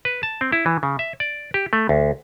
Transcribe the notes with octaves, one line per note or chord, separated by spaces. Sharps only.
B4
A5
C4
E4
E3
C#3
E5
D5
G4
A3
D2